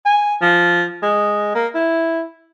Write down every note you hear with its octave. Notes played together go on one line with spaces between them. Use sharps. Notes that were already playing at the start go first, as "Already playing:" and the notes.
G#5
F3
G#3
A#3
E4